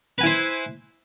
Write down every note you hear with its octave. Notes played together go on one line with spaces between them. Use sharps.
E4 B4 C5 G#5